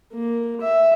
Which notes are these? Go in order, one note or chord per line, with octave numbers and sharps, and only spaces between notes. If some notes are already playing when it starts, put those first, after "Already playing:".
A#3
E5